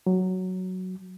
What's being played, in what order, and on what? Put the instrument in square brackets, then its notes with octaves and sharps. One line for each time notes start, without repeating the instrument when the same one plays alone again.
[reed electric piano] F#3